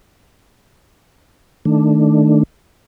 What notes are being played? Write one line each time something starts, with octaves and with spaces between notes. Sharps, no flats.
D#3 A3 D4